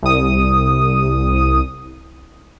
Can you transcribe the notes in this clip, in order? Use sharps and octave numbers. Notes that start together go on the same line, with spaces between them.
C2 D#6